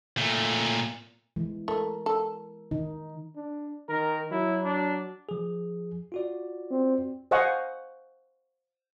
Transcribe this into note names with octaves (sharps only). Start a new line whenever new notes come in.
A#2 A3
E3 G#3
A3 A#4
A4
D#3 D#4
D4
D#3 A#4
F#3 E4
D4
F3 G#4
F4 F#4 D5
C4
C5 D#5 F5 F#5 G#5 C#6